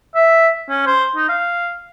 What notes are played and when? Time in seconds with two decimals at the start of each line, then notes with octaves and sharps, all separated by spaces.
0.15 E5
0.69 C#4
0.86 C5
1.16 D#4
1.29 F5